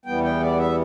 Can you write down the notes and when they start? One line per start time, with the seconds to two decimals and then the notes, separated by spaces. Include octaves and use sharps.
0.06 E2 E3 G3 B3 G5
0.23 G5
0.40 D5
0.58 E5